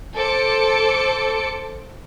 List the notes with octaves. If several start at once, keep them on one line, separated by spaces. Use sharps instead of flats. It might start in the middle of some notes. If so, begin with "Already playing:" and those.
A4 C5 D6 C#7